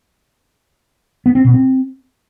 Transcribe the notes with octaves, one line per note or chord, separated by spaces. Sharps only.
B3
C4
B2
C4